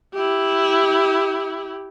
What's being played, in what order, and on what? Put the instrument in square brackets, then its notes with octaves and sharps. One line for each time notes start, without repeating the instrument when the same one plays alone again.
[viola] E4 G4